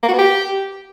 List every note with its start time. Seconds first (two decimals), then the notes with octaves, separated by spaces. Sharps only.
0.03 A#3
0.08 F#4
0.13 B3
0.19 G4